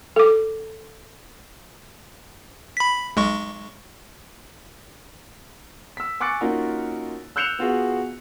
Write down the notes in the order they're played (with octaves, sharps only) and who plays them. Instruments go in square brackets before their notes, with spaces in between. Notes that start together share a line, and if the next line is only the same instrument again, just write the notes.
[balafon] A4 D6
[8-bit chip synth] B5 B6
B1 G#3 C#6
[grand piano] E6 B6
G#5 C#6 D6 F#6 A6 C#7
A#3 C#4 D#4 F4 F#4 A#4
E6 F#6 G6 C#7 E7 F7
B3 F4 F#4 G#4